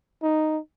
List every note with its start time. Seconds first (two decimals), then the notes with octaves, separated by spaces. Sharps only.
0.23 D#4